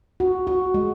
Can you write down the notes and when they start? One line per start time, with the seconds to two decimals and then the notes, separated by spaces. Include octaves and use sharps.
0.20 F#4
0.47 F#4
0.74 G#3